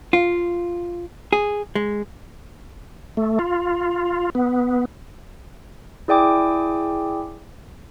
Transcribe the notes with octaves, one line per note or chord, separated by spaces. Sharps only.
F4
G#4
G#3
A3
F4
B3
E4 G#4 D5 G5 G#5 D6